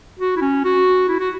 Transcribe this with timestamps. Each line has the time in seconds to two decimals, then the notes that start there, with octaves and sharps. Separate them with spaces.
0.19 F#4
0.36 E4
0.41 C#4
0.64 F#4
1.09 E4
1.19 F#4